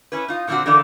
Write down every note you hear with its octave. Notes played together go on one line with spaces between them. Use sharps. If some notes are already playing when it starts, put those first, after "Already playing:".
C#4 E4 B4
D#4 F4
A#2 D3 F3 C4 D4 F#4
D3 E3 A#3 D#4 A4 D5